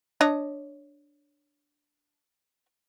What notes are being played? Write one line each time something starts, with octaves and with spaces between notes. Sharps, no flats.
D4 C#5 D#5